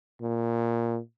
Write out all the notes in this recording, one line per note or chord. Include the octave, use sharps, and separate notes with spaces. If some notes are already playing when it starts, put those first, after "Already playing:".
A#2